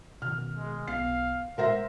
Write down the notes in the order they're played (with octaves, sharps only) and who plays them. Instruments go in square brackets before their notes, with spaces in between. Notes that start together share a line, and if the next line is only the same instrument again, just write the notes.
[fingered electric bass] B2 D#3 [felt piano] F6
[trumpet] G#3
[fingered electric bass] B1 B3 [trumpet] F5 [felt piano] C7
[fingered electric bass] A#2 G#3 [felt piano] A#4 E5 A#6 [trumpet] C5